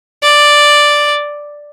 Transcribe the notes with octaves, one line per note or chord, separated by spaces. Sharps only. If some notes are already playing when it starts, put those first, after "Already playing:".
D5